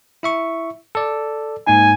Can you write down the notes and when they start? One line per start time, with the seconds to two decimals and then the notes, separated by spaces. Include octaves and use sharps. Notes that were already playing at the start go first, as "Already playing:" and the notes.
0.23 E4 E5 C#6
0.95 A4 D5
1.67 G#2 A#3 D#4 G#5